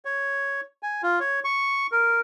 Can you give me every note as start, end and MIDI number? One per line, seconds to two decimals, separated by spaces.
0.05 0.61 73
0.83 1.02 80
1.03 1.19 65
1.20 1.40 73
1.44 1.87 85
1.92 2.20 70